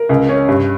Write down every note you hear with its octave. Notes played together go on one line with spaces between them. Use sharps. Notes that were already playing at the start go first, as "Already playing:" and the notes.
Already playing: A#4
C#2
C#4
G2